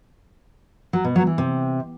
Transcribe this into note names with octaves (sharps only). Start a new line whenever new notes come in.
F#3
B2
F#3
E3
C3